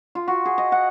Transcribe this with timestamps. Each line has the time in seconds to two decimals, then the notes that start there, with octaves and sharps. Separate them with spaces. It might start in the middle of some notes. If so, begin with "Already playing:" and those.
0.15 F4
0.28 F#4
0.45 G#4
0.58 D#5
0.72 F#5